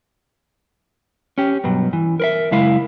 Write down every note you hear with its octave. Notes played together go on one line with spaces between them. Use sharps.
C#4 G4
G2 B2 F#3
E3
A#4 B4 E5
F#2 C#3 G#3 E4 F5